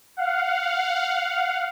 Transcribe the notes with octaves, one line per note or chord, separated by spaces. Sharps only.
F5 F#5